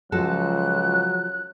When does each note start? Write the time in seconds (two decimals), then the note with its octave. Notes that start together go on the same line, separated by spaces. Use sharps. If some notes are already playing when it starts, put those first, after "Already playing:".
0.12 C#2 F3 F#3 F#4 A4 F#6